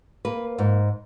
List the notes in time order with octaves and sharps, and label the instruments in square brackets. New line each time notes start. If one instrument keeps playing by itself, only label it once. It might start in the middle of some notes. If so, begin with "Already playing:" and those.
[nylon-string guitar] A#3 B4
G#2